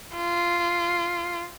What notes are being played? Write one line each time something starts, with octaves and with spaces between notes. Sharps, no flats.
F4